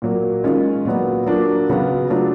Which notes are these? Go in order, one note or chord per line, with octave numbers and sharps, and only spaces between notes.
A#2 F#3 A#3
D#3 G#3 C#4 F4
A#2 F#3 B3
F#3 A#3 D4 F4
C#3 F#3 B3
F#3 A3 D4 F4